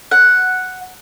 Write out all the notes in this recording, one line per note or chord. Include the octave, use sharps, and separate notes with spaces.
F#5